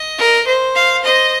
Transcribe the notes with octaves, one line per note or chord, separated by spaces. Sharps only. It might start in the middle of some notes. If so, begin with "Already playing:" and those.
Already playing: D#5
A#4
C5
F5
C5 D#5